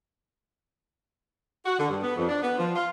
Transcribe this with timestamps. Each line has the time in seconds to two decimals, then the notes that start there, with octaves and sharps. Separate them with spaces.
1.66 F#4
1.78 D3
1.90 G2
2.02 B3
2.16 F2
2.29 D4
2.42 B3
2.58 F3
2.76 F4